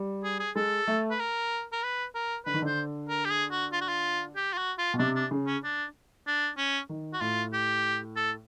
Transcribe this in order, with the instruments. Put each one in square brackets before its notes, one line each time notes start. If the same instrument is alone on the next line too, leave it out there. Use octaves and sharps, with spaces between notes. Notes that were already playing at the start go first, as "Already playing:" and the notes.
Already playing: [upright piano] G3
[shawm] G#4
G#4
[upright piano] G#3 [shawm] A4
[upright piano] A3
[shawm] B4
A#4
A#4
B4
A#4
[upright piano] D3 [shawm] B4
[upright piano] D#3
[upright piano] D3 [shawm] C5
[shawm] A#4
G4
G#4
F#4
F4
F#4
F4
G4
F4
F#4
F4
[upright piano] B2
[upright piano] C3 [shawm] D4
[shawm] D4
[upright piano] C#3
[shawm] C#4
D4
D4
C#4
[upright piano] D#3
[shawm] F#4
[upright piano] A2 [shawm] F4
[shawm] G4
A4